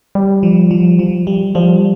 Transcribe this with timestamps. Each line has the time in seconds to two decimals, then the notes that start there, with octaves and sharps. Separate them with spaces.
0.15 G3
0.43 F3
0.71 F3
0.99 F3
1.27 G3
1.55 F3 G3